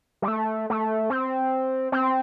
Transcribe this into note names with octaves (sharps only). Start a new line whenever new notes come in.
G3
A3
A3
C4
C4